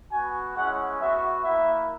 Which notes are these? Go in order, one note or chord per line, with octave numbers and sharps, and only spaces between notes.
B3 F#4 G#5
G#3 C#4 E4 F#5
B3 F#4 E5
A#3 E4 E5